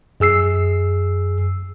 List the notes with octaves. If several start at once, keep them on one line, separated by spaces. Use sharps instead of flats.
F#2 G#4 E6 C7